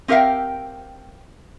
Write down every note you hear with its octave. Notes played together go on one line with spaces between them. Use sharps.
C4 G4 A#4 E5 F5 G5